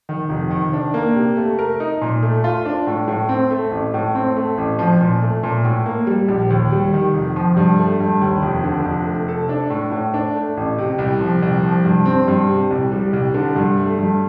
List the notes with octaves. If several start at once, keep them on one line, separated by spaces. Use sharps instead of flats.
D#3
F1
D#3
D4
A#3
C3
A3
A#4
D#4
A#2
A3
F4
D4
A2
A2
C4
A3
A1
A2
C4
A3
A1
F3
A#2
A3
A#2
A2
A#3
G3
A#1
D#2
G3
D#3
F1
F3
G2
A3
G2
D#2
F1
D3
F1
A3
A4
D4
A2
A2
D4
A3
A1
C3
C2
F3
C2
F3
G2
C4
G2
C3
C2
G3
C2
D3
G2
A3
G2